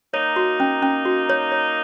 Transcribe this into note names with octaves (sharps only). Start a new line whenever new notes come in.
A#3 D#4 C#5
F#4
C#4
C#4
F#4
C#5
C#5